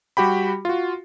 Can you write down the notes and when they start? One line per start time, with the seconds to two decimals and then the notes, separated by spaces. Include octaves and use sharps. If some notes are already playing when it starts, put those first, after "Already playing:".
0.17 G3 F#4 G4 G5 B5
0.65 F4 F#4